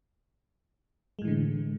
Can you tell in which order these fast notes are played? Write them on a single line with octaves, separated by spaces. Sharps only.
G#3 A2 E3 D3